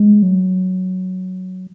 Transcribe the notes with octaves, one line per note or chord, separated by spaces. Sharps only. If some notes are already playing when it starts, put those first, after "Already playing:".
Already playing: G#3
F#3